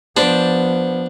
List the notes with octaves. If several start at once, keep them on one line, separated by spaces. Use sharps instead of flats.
F3 B3 D4 C5 D5 B5